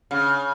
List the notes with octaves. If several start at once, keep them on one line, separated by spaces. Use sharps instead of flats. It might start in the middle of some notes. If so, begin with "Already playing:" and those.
C#3